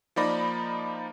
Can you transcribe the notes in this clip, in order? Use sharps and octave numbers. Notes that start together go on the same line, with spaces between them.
F3 A#3 D#4 D5 B5 A#6